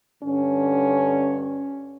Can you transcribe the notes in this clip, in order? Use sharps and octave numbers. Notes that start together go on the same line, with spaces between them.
G2 D3 C#4